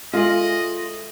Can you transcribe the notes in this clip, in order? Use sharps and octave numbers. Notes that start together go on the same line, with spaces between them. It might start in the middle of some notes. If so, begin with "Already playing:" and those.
G#3 F4 A4 D#5 E5 F#7